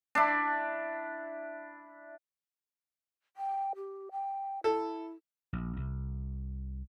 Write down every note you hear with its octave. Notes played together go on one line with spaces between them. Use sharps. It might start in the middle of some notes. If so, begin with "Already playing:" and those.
D4 E4
G5
G4
G5
E4 A4
A#1
C2